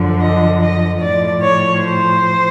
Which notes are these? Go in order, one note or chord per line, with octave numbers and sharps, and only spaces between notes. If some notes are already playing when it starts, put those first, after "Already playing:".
Already playing: F#2 D3 F3
D#5
D#5
A2 F3 D5
C#5
C5